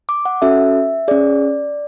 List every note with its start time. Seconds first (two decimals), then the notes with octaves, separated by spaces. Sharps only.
0.09 D6
0.25 F#5
0.42 C#4 F#4 A4 E5
1.08 C#4 G#4 D5